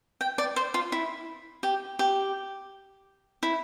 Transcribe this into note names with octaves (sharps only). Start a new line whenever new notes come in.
G5
D5
C5
F4
E4
G4
G4
E4